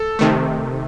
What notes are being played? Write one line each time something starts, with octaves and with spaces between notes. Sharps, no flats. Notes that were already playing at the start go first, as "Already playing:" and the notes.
Already playing: A4
C3 D#3 A3